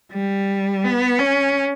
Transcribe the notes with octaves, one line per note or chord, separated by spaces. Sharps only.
G3
B3
C#4